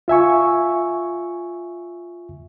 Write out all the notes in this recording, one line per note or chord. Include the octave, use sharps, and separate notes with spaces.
F4 E5 G#5 C#6